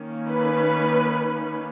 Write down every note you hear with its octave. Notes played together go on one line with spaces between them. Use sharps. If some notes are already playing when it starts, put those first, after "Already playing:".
Already playing: D#3 A#3 C#4
B4